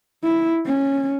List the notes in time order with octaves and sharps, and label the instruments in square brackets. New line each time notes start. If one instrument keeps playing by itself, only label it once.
[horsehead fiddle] E4
C#4